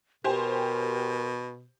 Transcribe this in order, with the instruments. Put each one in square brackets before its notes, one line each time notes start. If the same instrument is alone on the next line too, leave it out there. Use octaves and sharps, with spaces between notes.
[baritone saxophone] B2 [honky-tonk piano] G4 C5 G#5 [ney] A#4